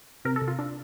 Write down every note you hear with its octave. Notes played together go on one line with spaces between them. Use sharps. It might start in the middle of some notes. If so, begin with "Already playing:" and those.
C3 A#4
A4
C3
F4
D4